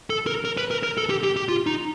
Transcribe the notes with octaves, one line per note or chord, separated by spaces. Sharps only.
A4
A#4
A#4
B4
A#4
A#4
A4
G4
G4
G4
F4
D#4